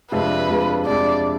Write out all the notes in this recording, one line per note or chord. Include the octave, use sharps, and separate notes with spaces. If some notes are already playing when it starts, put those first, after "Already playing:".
F2 C3 G#3 D4 F4 B4
F2 C3 G#3 D4 F4
F2 C3 G#3 D4 F4 D5